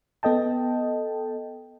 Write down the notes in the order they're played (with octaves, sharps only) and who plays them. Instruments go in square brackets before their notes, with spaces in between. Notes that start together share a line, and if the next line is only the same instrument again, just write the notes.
[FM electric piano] B3 A4 D#5 G5 A5